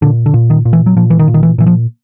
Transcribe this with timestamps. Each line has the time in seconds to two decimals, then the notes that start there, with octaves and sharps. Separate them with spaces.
0.02 A#2 D3
0.26 D3
0.34 A#2
0.50 D#3
0.65 A#2
0.73 E3
0.86 F#3
0.97 A#2 F3
1.10 E3
1.19 D#3
1.28 A#2
1.34 D#3
1.43 E3
1.58 A#2 E3
1.66 F3